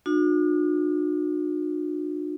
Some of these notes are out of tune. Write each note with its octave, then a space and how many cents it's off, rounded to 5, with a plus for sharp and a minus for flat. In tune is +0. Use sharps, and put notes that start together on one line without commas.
D4 +45 F#4 -45